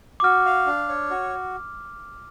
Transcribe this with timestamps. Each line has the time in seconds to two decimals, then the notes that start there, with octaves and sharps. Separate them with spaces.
0.20 D6
0.23 F#4 F6
0.46 F5
0.66 D4
0.89 C#5
1.10 F#4